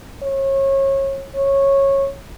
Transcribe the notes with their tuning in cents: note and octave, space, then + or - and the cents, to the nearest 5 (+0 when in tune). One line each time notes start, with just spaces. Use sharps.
C#5 -30
C#5 -15